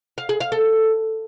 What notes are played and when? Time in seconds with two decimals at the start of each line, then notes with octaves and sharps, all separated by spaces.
0.18 F5
0.29 G#4
0.40 F5
0.52 A4